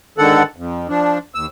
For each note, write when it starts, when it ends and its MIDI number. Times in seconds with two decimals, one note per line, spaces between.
0.18 0.43 44
0.18 0.43 50
0.18 0.43 51
0.18 0.43 69
0.18 0.43 78
0.56 0.88 41
0.89 1.18 53
0.89 1.18 62
1.35 1.46 39
1.35 1.46 88